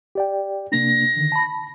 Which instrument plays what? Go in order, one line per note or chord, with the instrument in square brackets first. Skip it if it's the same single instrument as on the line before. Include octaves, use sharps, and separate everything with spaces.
[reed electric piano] G4 D5 G5
[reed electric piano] C3 A#3 D4 [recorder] A#6
[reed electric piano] D3 D#3
A5 B5